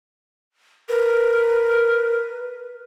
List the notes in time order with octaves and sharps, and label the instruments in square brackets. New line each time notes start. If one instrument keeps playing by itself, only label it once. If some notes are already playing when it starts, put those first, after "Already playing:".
[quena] A#4 [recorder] B4